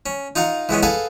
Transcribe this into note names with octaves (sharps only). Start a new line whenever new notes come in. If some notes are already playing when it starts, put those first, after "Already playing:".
C#4
D#4 F4 F5 F#5 A#5
E3 G#3 B3 C#4
G#4 A4 B4 F5 F#5 G#5